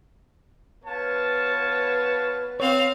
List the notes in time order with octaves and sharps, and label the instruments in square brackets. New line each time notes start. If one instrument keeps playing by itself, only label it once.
[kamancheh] B3 B4 [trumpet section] F4 C#5 A5
[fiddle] C4 F5 [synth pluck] C#5